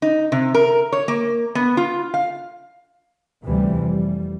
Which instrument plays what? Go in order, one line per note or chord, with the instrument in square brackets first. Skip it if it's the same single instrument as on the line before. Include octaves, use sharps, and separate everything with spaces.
[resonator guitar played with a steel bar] D#4
C3
A#4
C#5
A#3
B3
F4
F5
[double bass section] D2 C3 E3 G3
F1 G3